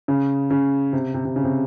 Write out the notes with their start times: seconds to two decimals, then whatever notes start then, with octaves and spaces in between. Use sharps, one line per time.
0.08 C#3
0.51 C#3
0.93 C3
1.14 C3
1.25 C3
1.36 C#3
1.44 C3